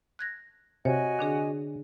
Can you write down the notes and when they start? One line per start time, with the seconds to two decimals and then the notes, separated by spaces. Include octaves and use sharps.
0.19 F#6 G#6 A#6
0.85 C3 F#4 C#5 D#5 G#5
1.19 D3 D4 G#4